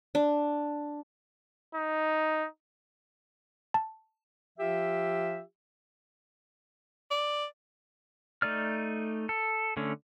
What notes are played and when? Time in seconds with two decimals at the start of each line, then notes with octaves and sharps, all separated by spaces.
0.15 D4
1.75 D#4
3.74 A5
4.59 F3 F4 G4 E5
7.11 D5
8.42 A3 D#4 D5 F6
9.29 A4
9.77 D3 A3 C#4